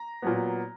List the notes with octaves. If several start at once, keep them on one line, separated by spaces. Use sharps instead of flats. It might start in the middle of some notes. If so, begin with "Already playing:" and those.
Already playing: A#5
A#2 F#3 B3